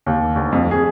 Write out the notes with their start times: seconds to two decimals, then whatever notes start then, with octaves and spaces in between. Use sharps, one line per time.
0.06 D#2
0.36 D2
0.52 F2
0.71 G#4